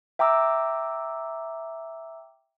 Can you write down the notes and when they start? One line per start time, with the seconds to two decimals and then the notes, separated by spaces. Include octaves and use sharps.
0.19 E5 G5 A#5 D6 E6